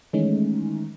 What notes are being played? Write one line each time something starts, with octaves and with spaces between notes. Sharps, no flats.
D#3 E3 G#3 A3 C#4 D#4